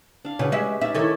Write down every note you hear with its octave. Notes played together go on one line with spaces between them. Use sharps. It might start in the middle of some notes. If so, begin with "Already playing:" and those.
D4 F5
C#3 C#4 F#4 B4
G#3 G4 E5
C#4 D#4 D5 E5
D#3 E4 A4 C#5 G#5